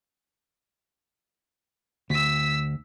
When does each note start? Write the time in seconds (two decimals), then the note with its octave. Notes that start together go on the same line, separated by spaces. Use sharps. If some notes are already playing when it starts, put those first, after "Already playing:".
2.10 D2 E6 B6